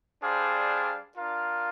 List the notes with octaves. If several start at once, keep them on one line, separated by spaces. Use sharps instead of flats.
G3 D4 G#4 C5 F5
D4 F4 A#4 F5